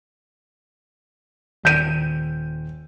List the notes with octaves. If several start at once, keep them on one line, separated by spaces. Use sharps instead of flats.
D#1 G6 D#7